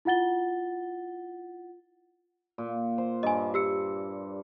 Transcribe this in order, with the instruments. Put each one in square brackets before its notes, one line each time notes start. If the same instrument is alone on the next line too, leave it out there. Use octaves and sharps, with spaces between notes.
[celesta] E4 F4 F#5 A6 G7
[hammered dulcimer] A#2
C5
[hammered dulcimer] G2 [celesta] D#5 G#5
[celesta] G4 E6 C#7